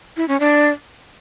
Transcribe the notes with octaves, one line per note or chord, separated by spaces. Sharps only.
E4
C#4
D4